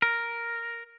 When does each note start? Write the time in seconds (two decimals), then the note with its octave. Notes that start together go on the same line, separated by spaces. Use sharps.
0.02 A#4